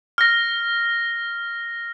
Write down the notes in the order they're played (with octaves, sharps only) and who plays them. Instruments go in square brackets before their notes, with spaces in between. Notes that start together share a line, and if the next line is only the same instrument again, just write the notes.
[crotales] F6 A#6